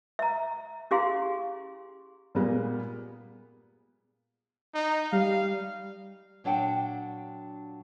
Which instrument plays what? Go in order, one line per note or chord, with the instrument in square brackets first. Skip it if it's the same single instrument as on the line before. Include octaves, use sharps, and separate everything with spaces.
[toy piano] E5 A#5
C#4 E4 G4 G#4 F5 C6
[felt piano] A#2 G3 G#3 A#3 B3 G#4
[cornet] D#4
[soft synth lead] G3 [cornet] F5
[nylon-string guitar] A#2 F#3 D4 F#5 G5